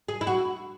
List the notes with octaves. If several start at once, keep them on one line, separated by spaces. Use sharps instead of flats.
G#4
E4
F#4